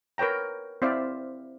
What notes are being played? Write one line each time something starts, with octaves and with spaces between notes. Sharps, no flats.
A#4 B4 C#5 G5 A#5
C4 E4 C5 D5 E5 F5